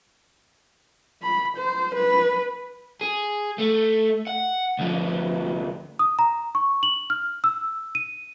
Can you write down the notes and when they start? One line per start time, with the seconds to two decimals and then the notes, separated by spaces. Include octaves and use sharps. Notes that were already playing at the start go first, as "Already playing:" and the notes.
1.22 B5
1.57 C5
1.95 B4
3.01 G#4
3.58 A3
4.27 F#5
4.79 D2 F3
5.99 D#6
6.19 A#5
6.55 C#6
6.83 F#7
7.10 F6
7.44 E6
7.95 D#7